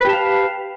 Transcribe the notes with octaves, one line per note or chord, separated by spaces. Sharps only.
G4 B4 F5 A5